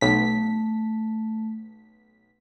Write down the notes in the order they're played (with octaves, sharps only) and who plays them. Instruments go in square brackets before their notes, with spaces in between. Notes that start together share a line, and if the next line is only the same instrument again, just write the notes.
[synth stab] B1 B6 [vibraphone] A3